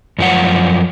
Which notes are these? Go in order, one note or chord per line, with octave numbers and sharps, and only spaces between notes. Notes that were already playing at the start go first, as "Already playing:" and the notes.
F#2 F3 F#5